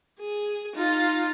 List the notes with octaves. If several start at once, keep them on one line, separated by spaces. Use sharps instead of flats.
G#4
D#4 F4